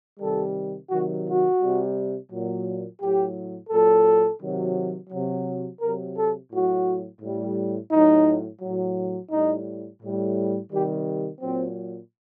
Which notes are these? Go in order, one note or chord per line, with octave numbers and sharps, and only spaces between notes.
C3 D#3 G3 A4
C3 D#3 F#3 F#4
F#4
C3 G3
A#2 F#3
A2 F#3 G4
A#2 F#3 A4
C3 D#3 F#3
C3 F#3
C3 F#3 A#4
A4
A2 F#3 F#4
A2 G3
A2 F#3 D#4
A2 F#3
A2 G3 D#4
A2 G3
C3 D#3 G3 G4
A#2 F#3 C4